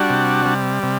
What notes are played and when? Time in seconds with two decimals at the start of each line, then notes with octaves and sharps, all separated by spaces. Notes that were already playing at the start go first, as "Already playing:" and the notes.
Already playing: G3 D4 F#4
0.10 C3
0.46 G3
0.83 C3